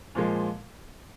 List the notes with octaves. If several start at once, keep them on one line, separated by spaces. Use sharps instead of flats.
A#2 F3 G#3